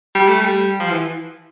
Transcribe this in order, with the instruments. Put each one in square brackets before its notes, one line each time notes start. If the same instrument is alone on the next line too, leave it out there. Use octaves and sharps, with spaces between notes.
[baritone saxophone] G3
A3
G3
F3
E3